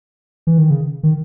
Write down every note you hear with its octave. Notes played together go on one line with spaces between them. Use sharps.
E3
D#3
C#3
D#3